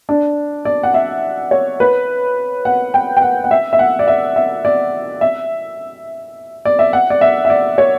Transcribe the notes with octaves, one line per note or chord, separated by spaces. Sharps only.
D4
D5
F#5
E5
C#5
B4
F#5
G5
G5
F#5
F#5
E5
E5
F#5
D5
E5
E5
D5
E5
D5
E5
F#5
D5
E5
E5
D5
C#5